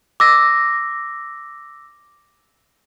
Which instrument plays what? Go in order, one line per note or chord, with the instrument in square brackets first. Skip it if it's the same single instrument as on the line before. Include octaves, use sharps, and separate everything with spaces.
[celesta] D6 E6 A#6